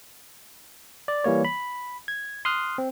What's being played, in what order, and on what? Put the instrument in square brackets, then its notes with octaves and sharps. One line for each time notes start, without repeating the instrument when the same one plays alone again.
[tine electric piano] D5
E3 G3 A#3 C#5
B5
G#6
C6 D#6 F6 F#6
C4